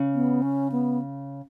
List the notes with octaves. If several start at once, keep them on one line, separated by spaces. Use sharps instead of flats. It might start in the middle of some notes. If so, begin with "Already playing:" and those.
Already playing: C#3
B3
C#4
B3